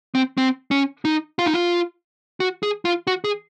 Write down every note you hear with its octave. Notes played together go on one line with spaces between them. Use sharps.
C4
C4
C#4
D#4
F4
D#4
F4
F#4
G#4
F4
F#4
G#4